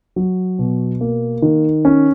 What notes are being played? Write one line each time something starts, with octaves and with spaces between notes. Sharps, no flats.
F#3
B2
A#3
D#3
C#4